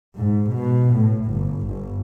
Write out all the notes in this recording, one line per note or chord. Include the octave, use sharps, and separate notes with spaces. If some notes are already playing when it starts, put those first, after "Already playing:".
G#2
B2
A2
G1
G1